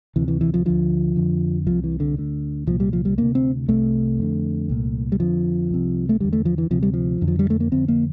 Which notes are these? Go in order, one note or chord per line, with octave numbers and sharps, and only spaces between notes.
D2 C3 E3
E3
E3
F3
D2 D3 F3
F2 D3
C2 C3 F3
E3
D3
D2 D3
C2 A#2 F3
G3
F3
G3
D2 C3 A#3
C4
C2 C3 A3
F2 D3
C2 A#2
G3
F2 D3 F3
C2 C3
A3
E2 D3 G3
A3
F3
E3
D2 C3 F3
G3
F3
F2 D3
F3
G3
A3
A#3
F2 D3 C4
A#3